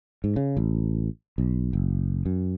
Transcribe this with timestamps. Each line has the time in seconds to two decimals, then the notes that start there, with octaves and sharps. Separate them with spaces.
0.24 G#2
0.36 C#3
0.57 A1
1.38 B1
1.73 F#1
2.26 F#2